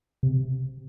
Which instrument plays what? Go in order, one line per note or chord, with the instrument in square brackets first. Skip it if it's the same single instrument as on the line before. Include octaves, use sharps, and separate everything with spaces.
[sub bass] C3